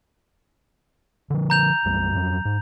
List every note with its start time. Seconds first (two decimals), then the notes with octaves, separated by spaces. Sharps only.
1.30 D3 F3
1.50 A#5 G6 F7
1.85 B1 F#2 G3
2.15 F2 F#3 C#4
2.45 G#2